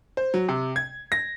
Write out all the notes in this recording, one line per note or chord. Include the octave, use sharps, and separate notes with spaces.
C5
F#3
C3
G#6
A#6